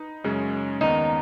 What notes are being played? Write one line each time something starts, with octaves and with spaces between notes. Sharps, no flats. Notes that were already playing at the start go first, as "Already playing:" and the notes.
Already playing: D#4 B4
F#2 C#3 G#3 C#4 G#4
D#2 D#3 B3 D#4